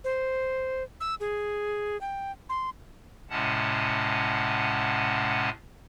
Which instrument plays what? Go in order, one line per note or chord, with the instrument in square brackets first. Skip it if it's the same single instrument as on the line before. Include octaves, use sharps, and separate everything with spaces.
[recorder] C5
E6
G#4
G5
C6
[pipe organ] A2 C3 G#3 C#4 F#5 A5